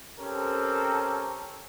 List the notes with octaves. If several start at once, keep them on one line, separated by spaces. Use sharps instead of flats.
C4 C#4 G4 A4 A#4